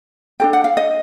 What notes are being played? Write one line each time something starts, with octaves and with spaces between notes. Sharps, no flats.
D4 F#4 A4 G5
F#5
F5
D#5